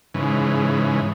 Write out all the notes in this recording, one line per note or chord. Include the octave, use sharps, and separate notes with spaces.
G#2 C#3 E3